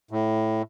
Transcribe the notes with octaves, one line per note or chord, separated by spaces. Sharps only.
A2